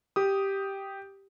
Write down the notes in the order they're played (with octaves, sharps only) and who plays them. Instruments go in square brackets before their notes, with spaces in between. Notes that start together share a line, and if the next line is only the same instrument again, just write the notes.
[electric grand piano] G4 D#6